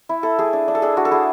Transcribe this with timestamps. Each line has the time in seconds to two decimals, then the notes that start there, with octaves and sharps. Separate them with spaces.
0.09 E4
0.23 E4 A4
0.39 A3 G#4
0.53 D4
0.68 D4
0.75 A4
0.82 D4 G#4
0.97 D4 F#4
1.05 A4
1.11 E4 G#4